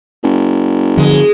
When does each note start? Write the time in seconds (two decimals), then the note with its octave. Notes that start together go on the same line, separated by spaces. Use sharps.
0.23 F#1
0.97 D3 F3 G#3